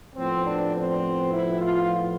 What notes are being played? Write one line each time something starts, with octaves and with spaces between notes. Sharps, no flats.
A2 F3 B3 C4
D4
C4
E4
F4